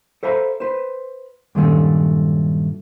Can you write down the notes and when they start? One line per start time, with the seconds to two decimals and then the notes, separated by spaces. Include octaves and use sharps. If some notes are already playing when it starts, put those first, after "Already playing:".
0.23 A4 C5 E5 F5 A#5 B5
0.60 B4 C5
1.55 G2 A#2 D#3 F#3 A3 C#4